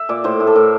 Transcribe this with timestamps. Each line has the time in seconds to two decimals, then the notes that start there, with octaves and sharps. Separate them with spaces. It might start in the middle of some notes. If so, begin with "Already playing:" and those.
Already playing: E5
0.09 A#2 D5
0.24 A2 C5
0.40 A2
0.47 A4
0.55 A2 A#4